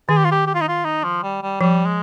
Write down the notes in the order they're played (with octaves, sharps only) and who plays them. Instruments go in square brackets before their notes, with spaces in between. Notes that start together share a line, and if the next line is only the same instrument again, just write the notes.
[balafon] D#3 [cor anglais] G#4
[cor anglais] G4
F4
G4
G4
F4
D#4
F4
D#4
F3
G3
G3
[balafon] F3 [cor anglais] G3
[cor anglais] G#3